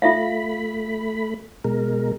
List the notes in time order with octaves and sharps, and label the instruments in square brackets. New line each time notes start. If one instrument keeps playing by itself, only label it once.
[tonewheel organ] A3 B5 [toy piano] F4 E5 F5
[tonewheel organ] B2 G#3 A#4